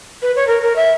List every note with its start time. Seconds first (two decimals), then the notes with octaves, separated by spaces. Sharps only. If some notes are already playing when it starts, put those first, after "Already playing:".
0.22 B4
0.36 C#5
0.47 A#4
0.62 A#4
0.76 E5